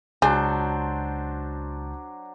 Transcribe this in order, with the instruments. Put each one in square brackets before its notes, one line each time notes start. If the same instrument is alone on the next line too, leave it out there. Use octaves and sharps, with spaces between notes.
[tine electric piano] C#2 A5 G6 [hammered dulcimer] F#3 D4 C5 [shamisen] G#4